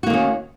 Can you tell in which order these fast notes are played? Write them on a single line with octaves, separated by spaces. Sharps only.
F#4 A#3 D#3 C#4